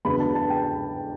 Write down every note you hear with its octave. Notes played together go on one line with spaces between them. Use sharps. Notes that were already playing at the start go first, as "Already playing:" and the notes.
E2 C#3 F#3 B3 D4 B5
A5
A5
G5